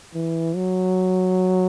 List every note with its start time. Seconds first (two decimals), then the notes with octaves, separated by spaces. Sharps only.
0.15 E3
0.56 F#3